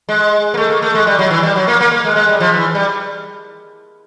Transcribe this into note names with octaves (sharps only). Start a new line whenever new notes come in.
G#3
A#3
A3
A#3
A3
G#3
G3
F#3
E3
G3
F#3
A#3
A#3
A#3
G#3
G#3
G3
F3
E3
G3